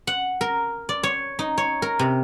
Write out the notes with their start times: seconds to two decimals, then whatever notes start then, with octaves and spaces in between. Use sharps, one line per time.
0.07 F#5
0.41 A#4
0.89 D5
1.03 C#5
1.39 D#4
1.58 C#5
1.82 A#4
1.99 C3